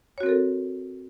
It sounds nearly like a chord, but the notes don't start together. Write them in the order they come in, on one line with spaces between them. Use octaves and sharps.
C#5 F#4 C4 A#4 A4